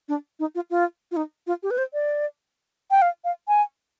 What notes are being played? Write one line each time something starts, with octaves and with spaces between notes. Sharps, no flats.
D4
D#4
F4
F4
F4
D#4
F4
G4
B4
C5
D5
G5
F5
F5
G#5